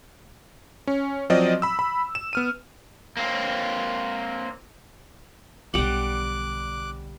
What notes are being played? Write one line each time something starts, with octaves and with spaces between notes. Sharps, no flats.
C#4
F3 F#3 C4 D5 D#5
B5 E6
B5
E7
B3 F6 D#7
A#3 C4
B1 D3 G3 F#5 D6 F#6